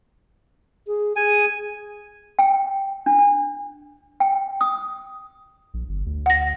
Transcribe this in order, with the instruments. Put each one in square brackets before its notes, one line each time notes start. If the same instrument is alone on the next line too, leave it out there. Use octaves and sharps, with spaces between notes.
[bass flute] G#4
[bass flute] G#4 [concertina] G#5
[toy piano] G5
D4
G5
D#6
[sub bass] A#1
G1
D2
[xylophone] F#5 A#6